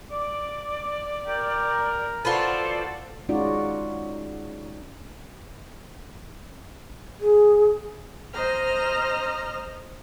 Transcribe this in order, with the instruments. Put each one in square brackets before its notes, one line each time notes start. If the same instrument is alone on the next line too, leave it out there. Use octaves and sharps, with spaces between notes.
[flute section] D5 [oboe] D6
[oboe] G4 [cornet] A#4
[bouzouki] F4 F#4 B4 [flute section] A4 C5 D5 [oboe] A5
[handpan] G#3 C#4 D#4 F4 F#4 D5
[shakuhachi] G#4
[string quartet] C5 D#5 A#5 F6